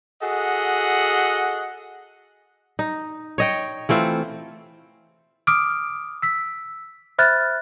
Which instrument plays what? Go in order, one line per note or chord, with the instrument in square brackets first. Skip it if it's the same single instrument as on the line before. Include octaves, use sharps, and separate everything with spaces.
[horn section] F#4 G#4 A4 D#5 F#5
[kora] D#4
C#5 D#5 G5
E3 A3 C4 F4
[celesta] D6 D#6 F6 D7
E6 B6
C5 E5 B5 F6 F#6 A6